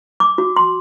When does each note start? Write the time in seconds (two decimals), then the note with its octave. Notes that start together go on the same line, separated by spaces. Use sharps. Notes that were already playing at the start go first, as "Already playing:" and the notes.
0.20 D6
0.38 F#4
0.57 C6